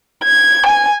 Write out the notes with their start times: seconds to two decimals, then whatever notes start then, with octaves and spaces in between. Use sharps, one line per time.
0.24 G#6
0.66 G#5